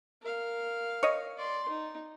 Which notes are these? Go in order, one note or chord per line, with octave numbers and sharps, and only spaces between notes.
A#4 F5
C#5 D#5
D5 C6
D#4